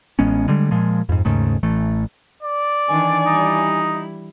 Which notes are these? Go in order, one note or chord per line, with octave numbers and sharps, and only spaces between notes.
A1 G#3 B3 C#4
D3 G3 G#3
A#2 F3 G#3
F2 G#2
D#2 G#2 C#3 A3
A1 E3 A3
D5
D#3 E3 D4 G#5
G3 D#4 E4